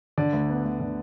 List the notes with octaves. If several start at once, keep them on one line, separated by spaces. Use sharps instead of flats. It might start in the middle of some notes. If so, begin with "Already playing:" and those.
D3 D5
D2
B3
D2
D3